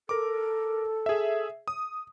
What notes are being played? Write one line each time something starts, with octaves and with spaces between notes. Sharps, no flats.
A4 A#4 D6
G#4 E5
D#6